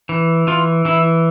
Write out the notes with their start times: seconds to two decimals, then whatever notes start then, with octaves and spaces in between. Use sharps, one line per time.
0.09 E3
0.47 E3 F4
0.85 E3 E4